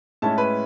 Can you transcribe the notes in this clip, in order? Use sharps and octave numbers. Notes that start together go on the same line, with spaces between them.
A2 G#3 C#4 E4 A5
B4